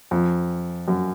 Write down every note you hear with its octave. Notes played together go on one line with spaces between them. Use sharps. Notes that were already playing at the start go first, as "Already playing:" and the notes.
F2
F#2